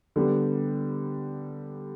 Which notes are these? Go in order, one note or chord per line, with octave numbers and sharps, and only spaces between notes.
D3 G3 B3